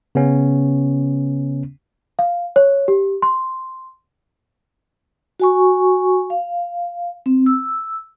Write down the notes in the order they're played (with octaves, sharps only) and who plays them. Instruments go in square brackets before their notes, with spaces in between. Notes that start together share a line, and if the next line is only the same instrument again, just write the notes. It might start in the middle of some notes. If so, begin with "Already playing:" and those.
[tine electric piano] C#3 B3 C#4
[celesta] F5
C#5
G4
C6
[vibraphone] F#4 G#5 C#6
F5
C4
E6